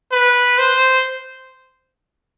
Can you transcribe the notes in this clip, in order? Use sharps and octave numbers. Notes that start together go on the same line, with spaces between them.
B4
C5